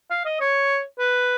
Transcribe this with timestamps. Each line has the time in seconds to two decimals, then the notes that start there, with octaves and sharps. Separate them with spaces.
0.10 F5
0.25 D#5
0.40 C#5
0.99 B4